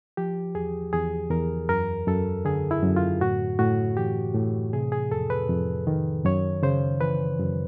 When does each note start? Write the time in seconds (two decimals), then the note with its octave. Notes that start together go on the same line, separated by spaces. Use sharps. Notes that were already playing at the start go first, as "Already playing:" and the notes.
0.17 F3 G4
0.55 E2 G#4
0.93 E2 G#4
1.31 E2 A#4
1.69 F#2 A#4
2.07 F#2 A4
2.45 D3 G#4
2.71 E4
2.83 F#2
2.96 F4
3.21 A2 F#4
3.59 A2 F#4
3.97 E3 G4
4.35 A2
4.73 C3 G#4
4.92 G#4
5.11 F2 A4
5.30 B4
5.50 F2
5.87 D#3
6.25 F#2 C#5
6.63 C#3 C5
7.01 E3 B4
7.40 F#2